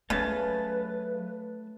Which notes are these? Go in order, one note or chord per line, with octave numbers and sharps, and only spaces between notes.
C#3 F#3 A3 B4 A5